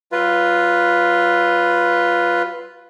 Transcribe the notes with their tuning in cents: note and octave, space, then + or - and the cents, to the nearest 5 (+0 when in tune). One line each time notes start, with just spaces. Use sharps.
F#3 +30 F4 +0 B4 +0